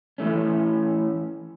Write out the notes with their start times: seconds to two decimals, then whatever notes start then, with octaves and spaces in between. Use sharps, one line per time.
0.18 E3 A3 C#4